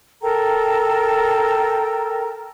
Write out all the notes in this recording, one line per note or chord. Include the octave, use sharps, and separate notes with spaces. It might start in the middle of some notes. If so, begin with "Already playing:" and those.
A4 A#4 G5 A#5